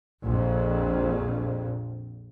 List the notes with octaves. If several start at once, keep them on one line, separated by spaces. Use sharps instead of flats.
A#1 F2